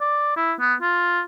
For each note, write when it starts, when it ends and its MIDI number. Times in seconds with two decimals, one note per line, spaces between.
0.01 0.36 74
0.37 0.53 64
0.60 0.74 59
0.82 1.21 65